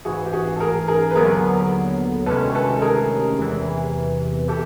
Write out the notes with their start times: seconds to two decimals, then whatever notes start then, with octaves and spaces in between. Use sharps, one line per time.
0.05 A1 G#2 E3 F#4 G#4
0.26 G4
0.33 F#4 G#4
0.56 A4
0.60 G#4 A#4
0.88 G#4 A#4
1.11 B4
1.15 D#2 D3 F#3 B3 G#4 A#4
2.26 D2 C3 D#3 G#3 C#4 A4 B4
2.55 A4 B4
2.76 A4
2.82 G#4 A#4
3.37 E2 C3 E3
4.48 E3 G4 A4